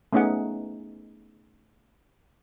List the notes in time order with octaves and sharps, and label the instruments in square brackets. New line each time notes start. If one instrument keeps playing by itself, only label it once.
[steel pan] A3 B3 C#4 D#4 G#4 F#5